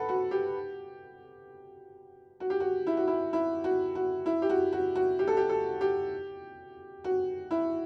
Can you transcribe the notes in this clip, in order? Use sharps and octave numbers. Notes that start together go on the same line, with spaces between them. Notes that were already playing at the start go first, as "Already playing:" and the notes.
Already playing: A4 B4 F#5
F#4
G4
F#4
G4
F#4
E4
F#4
E4
E4
F#4
F#4
E4
G4
F#4
F#4
F#4
G4
A4
G4
A4
G4
F#4
E4